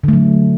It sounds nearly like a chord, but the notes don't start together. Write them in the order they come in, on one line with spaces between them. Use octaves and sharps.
D3 A3 F#3